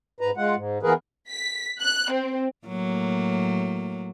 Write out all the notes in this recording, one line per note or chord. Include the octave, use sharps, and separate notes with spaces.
G#2 B4 A#5
G#3 F4 F#5
G#2
E3 A#3 B3 G#4 A#4 B4
B6
F#6
C4
A2 F#3 A#3